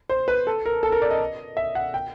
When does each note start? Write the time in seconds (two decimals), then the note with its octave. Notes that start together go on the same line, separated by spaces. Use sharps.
0.10 C5
0.28 B4
0.47 A4
0.66 A#4
0.83 A4
0.92 A#4
1.02 D5
1.11 D#5
1.57 E5
1.75 F#5
1.94 G5